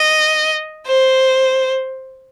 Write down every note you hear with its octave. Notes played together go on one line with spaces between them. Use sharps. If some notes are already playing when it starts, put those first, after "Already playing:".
Already playing: D#5
C5